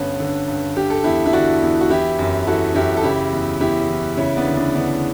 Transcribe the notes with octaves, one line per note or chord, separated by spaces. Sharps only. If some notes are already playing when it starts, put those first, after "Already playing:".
Already playing: G2 D3 B3 C#4
D3
G2
D3 G4
A4
E2 E4 G4
E4
D3 D4 F#4
E2
F#4
E3 E4 G4
F#2
E3 F#4 A4
F#2 E4 G4
A4
C#3 E4 G4
E2
E2 E4 G4
E3
C#3 C#4 E4
B3 D4
D2
B3 D4
D2 B3 D4